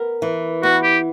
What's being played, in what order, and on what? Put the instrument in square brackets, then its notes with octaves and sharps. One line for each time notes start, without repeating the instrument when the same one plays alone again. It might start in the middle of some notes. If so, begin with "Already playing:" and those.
Already playing: [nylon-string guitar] B3 A#4
E3
[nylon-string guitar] B3 [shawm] F#4
[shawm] G4